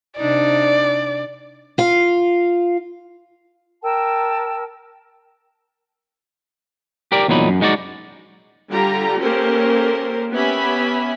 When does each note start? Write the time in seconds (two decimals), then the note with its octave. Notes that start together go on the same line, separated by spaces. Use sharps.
0.18 C3 D4 D#4 D5
1.78 F4 F5
3.83 A#4 G5 A5 E6
7.12 G4 A#4 D5
7.28 E2 A#2 F#3 D#4 B5
7.49 F#2
7.61 G#3 D#4 F#4 C#5 D5
8.69 D3 G3 F4 G4 A#5
9.22 A#3 C#4 G4 A4 A#4 C5
10.32 B3 C#4 G4 E5 G#5 B5